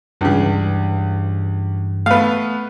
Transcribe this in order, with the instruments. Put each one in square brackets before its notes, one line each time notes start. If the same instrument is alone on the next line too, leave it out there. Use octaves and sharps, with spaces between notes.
[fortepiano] C#2 C#3 [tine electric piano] G2 E3
[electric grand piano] A3 B3 [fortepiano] B4 F5